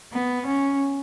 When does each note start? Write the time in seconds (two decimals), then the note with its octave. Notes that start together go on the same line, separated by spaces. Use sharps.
0.13 B3
0.46 C#4